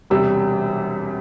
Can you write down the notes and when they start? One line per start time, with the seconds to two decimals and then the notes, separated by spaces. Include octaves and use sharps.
0.10 E1 E2 C3 G3 E6